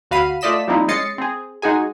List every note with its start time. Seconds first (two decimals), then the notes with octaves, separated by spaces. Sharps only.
0.11 D2 F#4 F5 B5 C7 D#7
0.41 A3 F4 D5 D#5 B6 E7
0.67 F3 G3 A#3 C4 D#4 E4
0.88 G#3 C#4 D#5 A6 C7 C#7
1.18 C4 G#4
1.62 G#3 D#4 F#4 G#4 G#5